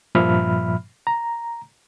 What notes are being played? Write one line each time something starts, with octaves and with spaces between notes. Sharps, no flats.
G2 A#2 F3 E5 B5 F6
A#5